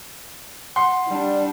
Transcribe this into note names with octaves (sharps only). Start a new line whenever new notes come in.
F#5 C6
G3 D4